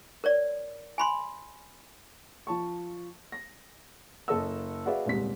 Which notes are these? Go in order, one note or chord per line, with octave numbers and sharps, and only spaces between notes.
A#4 C#5 D5
G#5 B5 C6
F3 A5 C#6
A#6
F#1 A4 D#5 E6
F#4 G#4 B4 D5 E5 F5
D#1 C2 G#2 G3 B6